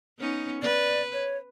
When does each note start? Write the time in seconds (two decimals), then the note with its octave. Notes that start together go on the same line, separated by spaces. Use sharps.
0.19 B3 C#4 D#4
0.62 B4 D5
1.13 C#5